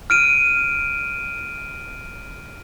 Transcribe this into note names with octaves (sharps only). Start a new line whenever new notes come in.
F6 D7 D#7